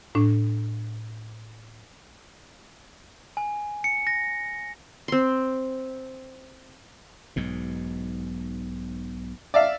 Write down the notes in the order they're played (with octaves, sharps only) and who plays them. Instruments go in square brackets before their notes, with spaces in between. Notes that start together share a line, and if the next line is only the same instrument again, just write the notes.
[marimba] A2 D4
[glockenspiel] G#5
C#7
A#6
[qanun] C4 C6
[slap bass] B1 G#2 B2
[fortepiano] D5 E5 F5